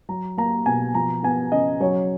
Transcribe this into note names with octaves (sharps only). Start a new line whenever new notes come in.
F#3 A#5
A#3 A#5
B2 G#5
F3 A#5
B3 G#5
C#3 D#5
F#3 C#5